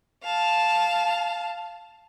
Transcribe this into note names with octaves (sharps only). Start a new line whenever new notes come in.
F5 A5